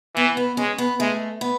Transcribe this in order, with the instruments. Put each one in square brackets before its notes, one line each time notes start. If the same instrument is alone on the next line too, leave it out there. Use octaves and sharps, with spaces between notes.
[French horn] E3 [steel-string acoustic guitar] B3
[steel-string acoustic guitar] B3
[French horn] G#3 [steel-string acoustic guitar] C#4
[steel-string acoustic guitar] B3
[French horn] G#3 [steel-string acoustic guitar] A3
[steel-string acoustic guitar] B3